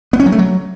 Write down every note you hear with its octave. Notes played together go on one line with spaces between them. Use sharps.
B3
C#4
F#3
A3
F#3